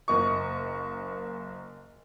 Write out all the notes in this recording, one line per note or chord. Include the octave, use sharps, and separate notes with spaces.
F#1 A#3 D#5 C#6